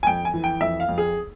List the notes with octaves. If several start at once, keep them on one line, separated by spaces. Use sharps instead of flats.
G#5
F2 G5
G#5
E3
G5
F2 E5
F5
F2
G#4